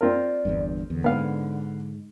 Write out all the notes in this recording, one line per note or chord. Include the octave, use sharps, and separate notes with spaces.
C4 F4 A#4 D5
G1 E2 G2
E2 D3
G#2 B3 F5